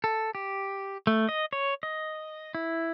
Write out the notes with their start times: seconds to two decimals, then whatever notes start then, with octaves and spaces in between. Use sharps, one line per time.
0.04 A4
0.35 G4
1.07 A3
1.29 D#5
1.53 C#5
1.83 D#5
2.55 E4